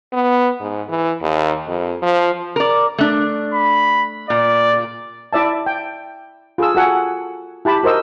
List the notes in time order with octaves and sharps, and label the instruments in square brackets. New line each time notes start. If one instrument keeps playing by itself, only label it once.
[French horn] B3
G#2
E3
D#2
F2
F3
[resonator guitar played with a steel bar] A#4 D5
A3 D4
[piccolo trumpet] B5
[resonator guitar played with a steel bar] A#2 [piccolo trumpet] D5
[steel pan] E4 D5 E5 A5
G5
F4 G#4 A4 E6
F#4 A4 F#5 G#5
E4 G4 A5 B5
F#4 A#4 C5 D#5 E6